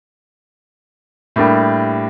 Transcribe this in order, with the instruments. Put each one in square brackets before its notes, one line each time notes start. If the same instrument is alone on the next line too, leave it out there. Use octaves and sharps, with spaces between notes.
[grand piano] A2 G3 A#3 D4 G4